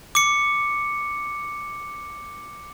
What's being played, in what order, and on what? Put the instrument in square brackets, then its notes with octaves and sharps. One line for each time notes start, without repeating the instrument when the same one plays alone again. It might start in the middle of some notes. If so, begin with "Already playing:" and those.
[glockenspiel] D6 C#7